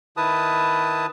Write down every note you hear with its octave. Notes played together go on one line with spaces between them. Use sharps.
D#3 E4 B4 A5 D#6